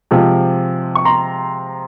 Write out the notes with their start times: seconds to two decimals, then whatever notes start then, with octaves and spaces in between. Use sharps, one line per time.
0.11 C3 F3 G#3
0.95 C#6
1.05 A#5 C6